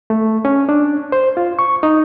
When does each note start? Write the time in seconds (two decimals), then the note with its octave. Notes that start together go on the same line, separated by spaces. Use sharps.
0.10 A3
0.45 C#4
0.69 D4
1.12 C5
1.37 F4
1.59 C#6
1.83 D#4